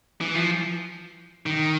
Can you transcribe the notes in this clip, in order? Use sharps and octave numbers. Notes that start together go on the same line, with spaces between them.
E3
F3
D#3